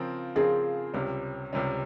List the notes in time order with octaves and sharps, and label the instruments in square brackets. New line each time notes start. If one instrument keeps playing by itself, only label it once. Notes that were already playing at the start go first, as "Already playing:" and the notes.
Already playing: [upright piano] C#3 F3 C4 F4 A#4
[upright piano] C#3 F3 C4 F4 A#4 [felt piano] G#4
[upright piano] C#2 C3 G3 C#4
C#2 C3 G3 C#4